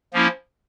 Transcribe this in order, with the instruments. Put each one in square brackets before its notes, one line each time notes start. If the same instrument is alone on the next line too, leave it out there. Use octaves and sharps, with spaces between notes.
[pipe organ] F3 A#3 C#4 E4